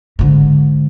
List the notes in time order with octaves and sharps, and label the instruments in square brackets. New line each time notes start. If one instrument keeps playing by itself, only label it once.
[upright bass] G#2 D3